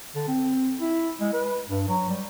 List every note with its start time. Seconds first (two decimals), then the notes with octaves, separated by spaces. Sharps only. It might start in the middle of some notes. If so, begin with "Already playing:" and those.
0.15 D3
0.27 C4
0.79 E4
1.21 G#3
1.34 B4
1.69 G2
1.88 F#3
2.09 G3